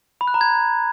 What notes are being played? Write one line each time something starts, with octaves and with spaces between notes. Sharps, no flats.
B5
F#6
A#5
G#6